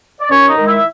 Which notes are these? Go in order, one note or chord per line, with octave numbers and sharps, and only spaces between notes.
D5
D#2 C#4 C#5
D#4 D#5
D#3 G#3
E4 E5